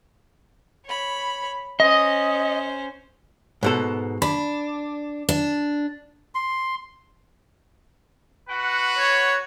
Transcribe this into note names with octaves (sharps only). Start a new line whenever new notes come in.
C#5 B5
C#4 C5 D#5
G#2 B2 A4
D4 B5
D4
C6
F#4 B4 F#5
C#5